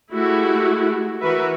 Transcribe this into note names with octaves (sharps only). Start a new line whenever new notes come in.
G#3 A3 E4 F#4 G4
E3 F#4 A#4 B4 E5